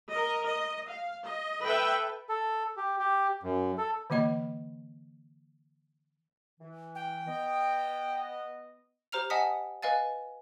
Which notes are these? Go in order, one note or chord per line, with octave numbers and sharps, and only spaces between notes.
A#4 D#5
D#5
F5
D#5
A4 B4 E5 G5
A4
G4
G4
F#2
A4
D3 E3 A#3 D#5 B5
E3
G5
B3 D#5
G4 C5 A#5 F6 F7
D#5 F#5 G#5 A5 D#6 B6
B4 D#5 F5 G#5 A6